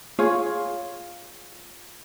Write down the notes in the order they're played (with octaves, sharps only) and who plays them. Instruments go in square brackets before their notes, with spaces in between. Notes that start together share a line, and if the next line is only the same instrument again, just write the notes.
[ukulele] F4 G#4 C#5 F5